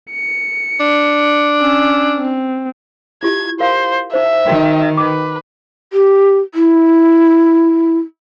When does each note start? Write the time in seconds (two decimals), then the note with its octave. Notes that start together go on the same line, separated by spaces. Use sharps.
0.12 C#7
0.80 D4
1.61 C#4 E6
2.18 C4
3.23 E4 F4 G4 G#6
3.60 A#4 C5 F5
4.13 D#4 C5 E5
4.47 D#3 F#4 A#4 G5
4.97 B4 D6
5.93 G4
6.54 E4